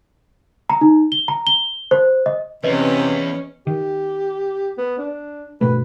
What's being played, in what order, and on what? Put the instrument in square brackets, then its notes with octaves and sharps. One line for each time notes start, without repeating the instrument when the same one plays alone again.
[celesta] A#5
D#4
G7
A#5
G7
C5
D#5
[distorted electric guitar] E2 [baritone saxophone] C3 [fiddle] C#4 [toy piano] B4 D#5
[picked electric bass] D#3 [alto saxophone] G4
[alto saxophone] B3
D4
[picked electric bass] G2 B2 A3 [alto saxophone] B4